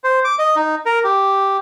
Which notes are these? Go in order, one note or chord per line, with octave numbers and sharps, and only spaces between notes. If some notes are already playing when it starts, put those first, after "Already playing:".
C5
D6
D#5
D#4
A#4
G4